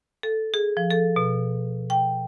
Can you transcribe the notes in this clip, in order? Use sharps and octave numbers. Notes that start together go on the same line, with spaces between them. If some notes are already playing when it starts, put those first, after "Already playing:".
A4
G#4
F3
A4
B2
G5